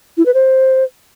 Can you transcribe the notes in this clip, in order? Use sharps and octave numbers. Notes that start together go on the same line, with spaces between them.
E4
B4
C5